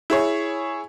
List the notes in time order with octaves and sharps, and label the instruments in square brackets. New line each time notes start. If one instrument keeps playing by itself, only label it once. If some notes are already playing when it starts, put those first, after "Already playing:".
[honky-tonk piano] E4 G#4 C#5